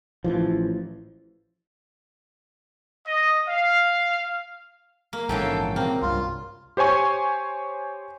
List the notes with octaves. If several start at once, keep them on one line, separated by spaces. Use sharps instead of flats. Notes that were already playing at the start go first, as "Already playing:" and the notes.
A1 E3 F3
D#5
F5
A#3
A#1 G#2 C#3 E3 F#3 A4 G5
C3 A#3 C4
C2 G2 F4
G4 C5 C#5 G#5 C#6